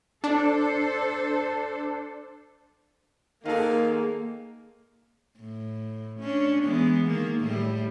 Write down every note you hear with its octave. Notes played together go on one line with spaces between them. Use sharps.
D4 A4 C5
G#2 D#3 A#3 G#4 A4 F5
A2
C#4 D4
E3 G#3 B3
D#3 A#3
A2 G3